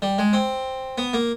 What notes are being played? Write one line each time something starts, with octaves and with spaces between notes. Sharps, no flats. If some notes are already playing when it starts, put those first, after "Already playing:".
G3
G#3
C4
B3
A#3